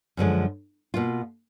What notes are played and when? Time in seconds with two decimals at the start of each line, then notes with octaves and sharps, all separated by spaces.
0.17 F#2 D3 F3 G#3
0.94 B2 A#3 F4